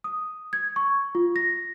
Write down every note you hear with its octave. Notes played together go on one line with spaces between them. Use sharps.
D#6
G#6
C#6
F4
A#6